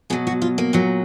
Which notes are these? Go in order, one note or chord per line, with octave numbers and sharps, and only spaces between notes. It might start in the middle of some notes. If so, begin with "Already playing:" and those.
B2 F#3 G#4
F#4
F4
A#3
A#2 F#3